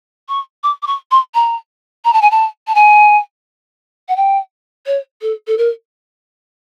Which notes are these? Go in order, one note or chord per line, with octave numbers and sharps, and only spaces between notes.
C#6
D6
D6
C#6
C6
A#5
A#5
A5
G#5
A5
A5
G#5
F#5
G5
C#5
A4
A4
A#4